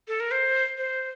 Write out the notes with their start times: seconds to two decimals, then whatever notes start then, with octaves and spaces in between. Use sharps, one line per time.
0.08 A4
0.20 A#4
0.31 C5
0.77 C5